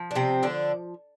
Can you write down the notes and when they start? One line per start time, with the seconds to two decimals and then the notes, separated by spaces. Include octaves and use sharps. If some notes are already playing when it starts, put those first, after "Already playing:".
Already playing: F3
0.11 D4
0.15 C3 C4
0.43 D3 D4